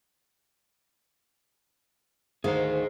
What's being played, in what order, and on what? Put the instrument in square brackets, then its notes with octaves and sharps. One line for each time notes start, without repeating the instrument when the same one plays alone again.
[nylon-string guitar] D2 D#3 F5 [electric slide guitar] G#4 C5